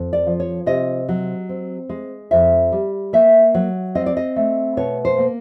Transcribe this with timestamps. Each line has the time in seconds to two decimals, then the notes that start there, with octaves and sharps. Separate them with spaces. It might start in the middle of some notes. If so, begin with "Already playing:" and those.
Already playing: F2
0.13 D5
0.26 F3
0.40 C#5
0.66 C3 D#5
1.09 F#3
1.49 C4
1.89 G#3
2.31 F2 E5
2.72 G3
3.13 A#3 E5
3.54 F#3
3.95 C4 D#5
4.06 D5
4.17 D#5
4.36 A3
4.77 B2 C#5
5.05 C5
5.18 A#3